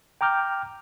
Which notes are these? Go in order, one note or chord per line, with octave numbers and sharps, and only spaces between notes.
G5 A#5 D6 F6 G6